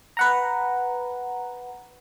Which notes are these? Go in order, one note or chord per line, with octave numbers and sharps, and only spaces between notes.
B4 F#5 A#5